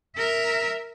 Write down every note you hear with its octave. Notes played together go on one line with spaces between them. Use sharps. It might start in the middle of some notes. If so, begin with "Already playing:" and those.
A#4 E5